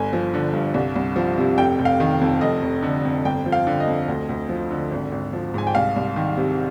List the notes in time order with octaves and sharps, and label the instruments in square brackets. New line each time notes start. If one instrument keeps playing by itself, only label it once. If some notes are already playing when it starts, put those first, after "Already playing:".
Already playing: [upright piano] G1 G#5
F3
D3
G2
C2
C2
F3
C3
F1 G5
F1
F5
D#3
F2
F1 D#5
F1
D3
F2
G1 G5
F3
F5
D3
D#5
F2
D2
D2
F3
D3
G#1
G#1
F3
G#2 G#5
G5
C2 F5
C2
D#3
C3